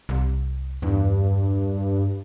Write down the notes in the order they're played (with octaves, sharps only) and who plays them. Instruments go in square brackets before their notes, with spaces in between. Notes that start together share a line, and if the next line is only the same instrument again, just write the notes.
[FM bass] C2
[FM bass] E2 [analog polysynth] G2